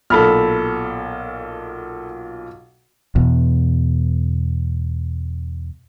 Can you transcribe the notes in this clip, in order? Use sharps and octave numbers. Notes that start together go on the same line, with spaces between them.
B1 A#2 A4 B5 F6
E2 B2